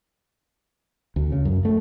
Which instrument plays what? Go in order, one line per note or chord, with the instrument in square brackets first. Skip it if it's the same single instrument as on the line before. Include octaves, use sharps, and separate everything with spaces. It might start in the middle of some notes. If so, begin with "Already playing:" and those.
[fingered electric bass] D2
C#3
F#2
A3